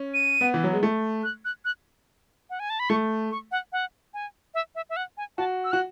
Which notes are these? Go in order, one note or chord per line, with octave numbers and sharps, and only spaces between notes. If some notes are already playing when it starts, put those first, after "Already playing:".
Already playing: C#4
D#7
B3
E3
F#3
G#3
A3
F#6
F#6
F#6
F#5
G#5
A5
B5
A3 C#6
C#6
F#5
F#5
G#5
E5
E5
E5
F#5
G#5
F#4 A5
E6
F#4 F#6